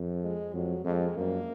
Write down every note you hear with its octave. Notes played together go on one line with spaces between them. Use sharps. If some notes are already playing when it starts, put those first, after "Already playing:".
Already playing: F2
G#3
F2 F#3
F2 G#3
F#2 A#3